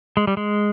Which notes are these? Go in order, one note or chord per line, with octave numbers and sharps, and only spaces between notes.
G#3
G3
G#3